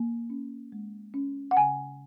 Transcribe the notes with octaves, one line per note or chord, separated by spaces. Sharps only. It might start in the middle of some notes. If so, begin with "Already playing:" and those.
Already playing: A#3
C#4
G#3
C#4
F#5
C#3 G#5